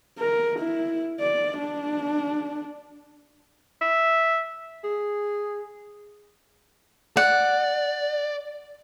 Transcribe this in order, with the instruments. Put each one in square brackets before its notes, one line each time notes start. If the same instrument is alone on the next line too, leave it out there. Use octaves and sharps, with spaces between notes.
[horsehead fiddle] A#4
E4
D5
D4
[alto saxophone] E5
G#4
[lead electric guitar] D5 [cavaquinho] F#5